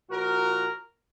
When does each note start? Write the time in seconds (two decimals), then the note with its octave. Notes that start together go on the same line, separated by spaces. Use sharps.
0.10 A#2 F3 F#4 A#4